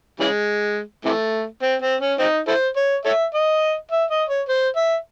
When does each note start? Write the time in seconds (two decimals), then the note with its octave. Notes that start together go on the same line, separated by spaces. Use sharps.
0.20 C#3 E3 G#3
1.05 C3 E3 A3
1.62 C4
1.82 C4
2.01 C#4
2.19 C4 D#4
2.48 E4 A4 C5
2.76 C#5
3.05 A4 C#5 E5
3.34 D#5
3.91 E5
4.10 D#5
4.29 C#5
4.48 C5
4.76 E5